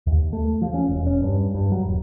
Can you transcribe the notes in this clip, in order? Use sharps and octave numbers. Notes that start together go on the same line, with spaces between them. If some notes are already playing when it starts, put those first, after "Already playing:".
D#2
A3
F3
C#4
E1
C#4
G2
G2
F#3
D#1